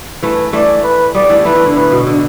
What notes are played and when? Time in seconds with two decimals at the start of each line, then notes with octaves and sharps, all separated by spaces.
0.22 E3 A3 B4
0.53 E3 A3 D5
0.84 B4
1.15 G3 B3 D5
1.29 E3 A3
1.45 E3 A3 B4
1.55 E3
1.66 D3
1.76 A2 B4
1.92 B2
2.07 D3